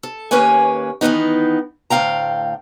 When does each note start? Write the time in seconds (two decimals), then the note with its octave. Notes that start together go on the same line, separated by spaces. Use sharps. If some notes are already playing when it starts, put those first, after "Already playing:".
0.03 A4
0.31 D#2 A#3 C#4 B4 C#5 G#5
1.01 D#3 E3 A3 B3 D#4
1.90 D2 A2 F5 G5 A#5